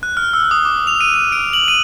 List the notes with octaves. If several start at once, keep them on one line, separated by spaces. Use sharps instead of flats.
F#6
F6
E6
D#6
D6
F7
D#7
D#7
D7
F#7
D#7